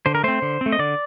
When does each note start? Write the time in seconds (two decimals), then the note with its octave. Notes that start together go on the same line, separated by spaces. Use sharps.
0.06 D3 C5
0.15 A#4
0.24 A3 C4 C5
0.42 D3
0.61 A3 C4
0.72 D#5
0.79 D3 D5